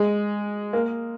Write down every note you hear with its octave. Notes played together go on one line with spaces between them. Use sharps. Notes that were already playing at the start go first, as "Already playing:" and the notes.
Already playing: G#3
A#3